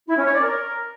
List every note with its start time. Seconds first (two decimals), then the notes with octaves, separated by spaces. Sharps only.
0.08 E4
0.17 C#4
0.25 C#5
0.34 D5
0.42 A#4